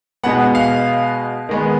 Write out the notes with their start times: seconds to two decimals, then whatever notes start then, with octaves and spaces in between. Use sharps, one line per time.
0.24 B2 G#3 B3 F#5
0.55 F5
1.49 D#3 G#3 B3